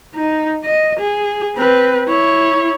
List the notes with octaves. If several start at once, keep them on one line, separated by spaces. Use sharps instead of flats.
D#4
D#5
G#4
C4 B4
E4 C#5